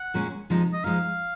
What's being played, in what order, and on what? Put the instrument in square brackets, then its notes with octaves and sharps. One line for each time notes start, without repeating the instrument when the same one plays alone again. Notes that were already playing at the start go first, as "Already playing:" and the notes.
Already playing: [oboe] F#5
[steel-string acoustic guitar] A#2 G#3 C#4
C3 F3 G#3 D#4
[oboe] D#5
[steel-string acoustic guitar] F3 G#3 D#4 [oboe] F5